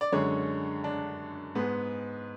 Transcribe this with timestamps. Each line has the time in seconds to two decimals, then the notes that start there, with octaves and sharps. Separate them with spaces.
0.01 D5
0.12 F#2 D3 G#3 C#5
0.84 D4
1.55 G#2 G#3 B3